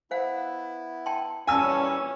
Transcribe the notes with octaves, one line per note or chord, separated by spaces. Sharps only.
B3 E4 C5 F5 F#5
G5 A5 C6
A#2 E3 G3 C#4 F5 G#5 A5 E6